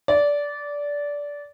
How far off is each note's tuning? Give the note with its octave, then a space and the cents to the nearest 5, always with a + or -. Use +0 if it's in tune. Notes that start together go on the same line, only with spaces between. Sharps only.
D5 -15